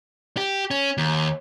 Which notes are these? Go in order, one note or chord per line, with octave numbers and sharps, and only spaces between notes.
G4
C#4
D#2